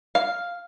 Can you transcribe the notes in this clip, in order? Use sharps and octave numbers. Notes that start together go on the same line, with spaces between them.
F5